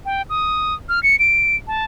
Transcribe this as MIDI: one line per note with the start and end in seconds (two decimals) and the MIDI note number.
0.06 0.22 79
0.29 0.74 87
0.89 1.02 89
1.03 1.18 97
1.19 1.56 98
1.67 1.84 81